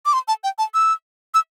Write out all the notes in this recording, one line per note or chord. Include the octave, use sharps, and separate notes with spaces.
D6
C6
A5
G5
A5
E6
E6